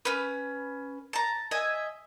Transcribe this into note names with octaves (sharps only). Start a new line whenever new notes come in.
C#4 B4
A5 A#5
D#5 E5 G#5